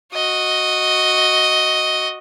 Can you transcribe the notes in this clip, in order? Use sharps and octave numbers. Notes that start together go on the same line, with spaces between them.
F#4 D#5